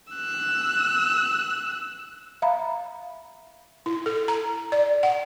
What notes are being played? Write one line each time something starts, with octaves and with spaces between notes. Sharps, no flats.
E6 F#6
E5 F5 A#5 B5
E4
A4
A#5
D5
F#5